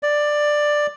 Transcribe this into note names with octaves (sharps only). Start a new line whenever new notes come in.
D5